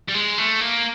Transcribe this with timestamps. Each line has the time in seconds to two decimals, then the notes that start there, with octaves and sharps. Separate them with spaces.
0.08 G3
0.14 G#3
0.38 A3
0.61 A#3